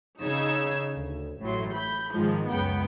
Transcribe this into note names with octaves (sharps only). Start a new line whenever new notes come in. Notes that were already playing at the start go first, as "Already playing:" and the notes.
C#3 D#4 E6 G#6
D2
A1 A2 F#3 C6
B5 G6
G#2 D#3 F3 G#3
C#2 F#2 B3 G5